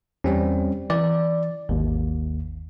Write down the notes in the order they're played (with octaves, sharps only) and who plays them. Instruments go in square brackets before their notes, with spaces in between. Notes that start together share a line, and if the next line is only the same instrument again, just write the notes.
[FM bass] E2 [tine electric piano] G3 C4 C#4
[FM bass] E3 [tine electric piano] D5
[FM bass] G#1 [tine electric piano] D#2